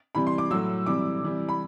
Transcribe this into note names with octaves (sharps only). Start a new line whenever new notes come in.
C3 E3 G3 B5
C6
D6
A2 F#3 E6
C3 E3 G3 D6
C3 E3 G3
B5